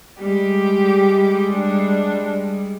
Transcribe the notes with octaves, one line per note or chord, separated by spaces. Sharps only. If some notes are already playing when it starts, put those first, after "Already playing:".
G3 G#3 G4
D4